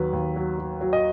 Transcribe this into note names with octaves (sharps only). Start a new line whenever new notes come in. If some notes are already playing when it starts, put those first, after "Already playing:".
Already playing: D#2 F#3 B4
D#2
F#3
F#3
F#3
D#5